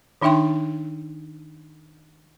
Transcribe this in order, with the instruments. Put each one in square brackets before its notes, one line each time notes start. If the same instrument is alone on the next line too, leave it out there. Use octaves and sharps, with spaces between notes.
[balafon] D#3 D4 D#4 E5 G5 C6